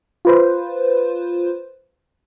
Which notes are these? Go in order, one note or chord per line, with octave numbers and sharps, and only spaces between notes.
F4 B4 C5